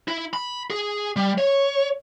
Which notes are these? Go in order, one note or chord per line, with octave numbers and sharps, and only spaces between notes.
E4
B5
G#4
G3
C#5